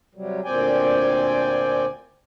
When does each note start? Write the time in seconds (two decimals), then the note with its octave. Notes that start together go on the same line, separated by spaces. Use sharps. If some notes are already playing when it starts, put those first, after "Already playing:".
0.15 C3 F#3 G3
0.45 D2 A#2 C4 D5 G5 G#5